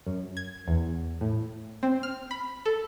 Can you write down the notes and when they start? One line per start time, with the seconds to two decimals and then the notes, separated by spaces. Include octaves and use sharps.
0.06 F#2
0.37 G#6
0.68 E2
1.21 A2
1.83 C4
2.03 F6
2.31 B5
2.65 A4